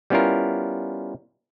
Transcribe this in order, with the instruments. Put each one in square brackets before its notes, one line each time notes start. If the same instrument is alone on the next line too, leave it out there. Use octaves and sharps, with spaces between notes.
[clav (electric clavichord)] G3 B3 C#4 E4 F4 A#4